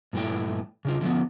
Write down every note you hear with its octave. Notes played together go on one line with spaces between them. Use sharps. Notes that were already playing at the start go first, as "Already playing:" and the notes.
G2 A#2 E3 A3 E4 G5
C#3 D4 F4
D3 F3 A#3 B3